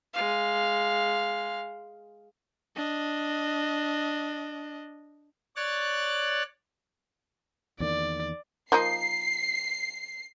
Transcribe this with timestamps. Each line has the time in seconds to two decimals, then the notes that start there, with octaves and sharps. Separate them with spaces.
0.14 G#3 F5
2.76 D4 D#5
5.56 C#5 D5 F#6 A6
7.80 E2 D#3 A#3 D5
8.72 F3 A#3 D#4 C7